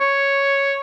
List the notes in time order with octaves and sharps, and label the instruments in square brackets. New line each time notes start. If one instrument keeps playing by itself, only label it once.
[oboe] C#5